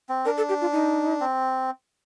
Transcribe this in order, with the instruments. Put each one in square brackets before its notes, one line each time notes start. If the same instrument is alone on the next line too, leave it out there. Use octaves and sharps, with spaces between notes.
[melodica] C4
[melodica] D4 [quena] A#4
[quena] A4
G4
F4
D#4
[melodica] C4